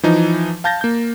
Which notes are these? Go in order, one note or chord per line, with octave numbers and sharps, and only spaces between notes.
E3 F3 D#4
F5 A5 G6 A6 A#6
A#3 G6